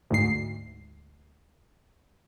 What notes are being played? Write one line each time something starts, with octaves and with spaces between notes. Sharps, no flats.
D2 G#2 C7